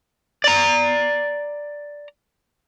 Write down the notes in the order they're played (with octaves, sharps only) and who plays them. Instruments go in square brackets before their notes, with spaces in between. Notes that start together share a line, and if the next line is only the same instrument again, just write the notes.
[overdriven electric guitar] D5 A#5